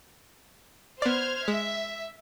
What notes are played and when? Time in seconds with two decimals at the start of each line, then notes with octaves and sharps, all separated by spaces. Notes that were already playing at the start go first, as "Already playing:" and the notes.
1.02 B3 C5 D5 F6 G#6
1.48 G#3 E5